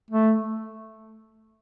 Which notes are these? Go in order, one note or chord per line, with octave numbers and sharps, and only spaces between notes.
A3